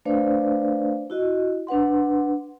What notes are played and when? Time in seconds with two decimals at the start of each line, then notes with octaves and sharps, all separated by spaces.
0.05 A3 D4 B4 C5 D5 F5
1.10 E4 F#4 D#5
1.67 D4 B4 F#5 C6